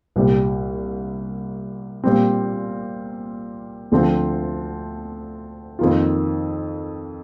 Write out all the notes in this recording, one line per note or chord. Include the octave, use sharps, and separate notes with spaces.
C2 A#2 G3
A#2 G3 C4
D2 D3 F3 C4
F2 D#3 A#3 F4